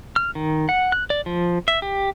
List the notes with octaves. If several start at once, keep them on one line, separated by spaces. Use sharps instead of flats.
F6
D#3
F#5
F#6
D5
F3
E5
G4